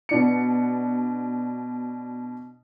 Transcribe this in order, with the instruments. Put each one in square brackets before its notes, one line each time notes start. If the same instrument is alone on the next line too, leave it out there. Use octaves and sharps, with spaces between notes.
[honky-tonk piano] B2 D4 C#7